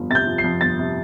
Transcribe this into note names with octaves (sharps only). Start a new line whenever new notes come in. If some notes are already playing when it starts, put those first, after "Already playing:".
Already playing: G1 F2 F3
C3 A6
G6
F3
C7
F2
G1 A6
C3